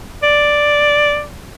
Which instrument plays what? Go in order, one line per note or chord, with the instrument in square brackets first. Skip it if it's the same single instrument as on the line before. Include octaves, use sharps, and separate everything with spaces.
[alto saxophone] D5